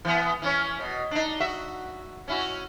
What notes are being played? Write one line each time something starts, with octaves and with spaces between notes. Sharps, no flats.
E3 B3
E3 C#4 C#5
B2
D4 D#4
F#4 E5
C#4 E4 F#4